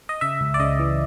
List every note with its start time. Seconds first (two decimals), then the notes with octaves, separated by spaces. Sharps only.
0.09 D#5
0.21 C#3 E5
0.41 C#2
0.54 D5
0.60 C#3 D#5
0.79 E3